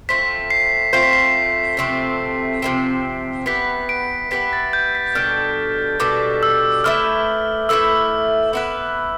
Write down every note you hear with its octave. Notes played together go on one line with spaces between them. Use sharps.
A3 C4 F4 C5 B6
C7
A3 C4 F4 C5 C7
B6
C7
C3 F3 A3 C4
C3 F3 A3 C4
B3 E4 G4 B4 B6
D7
B3 E4 G4 B4 B6
A6
G6
B6
B2 G3 D4 A4 F6
B2 G3 D4 A4 D6
E6
A3 E4 B4 E5 F6
A3 E4 B4 E5 E6
B3 E4 B4